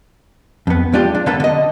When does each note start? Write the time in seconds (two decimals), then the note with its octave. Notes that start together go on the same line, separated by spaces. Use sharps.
0.67 F2 B3
0.93 G#3 D4 F4 G4
1.15 D4
1.26 D3 A#3 B3 D4 A4
1.40 D3 D#5